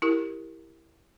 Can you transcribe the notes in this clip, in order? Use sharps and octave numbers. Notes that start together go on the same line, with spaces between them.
E4 G4 A#4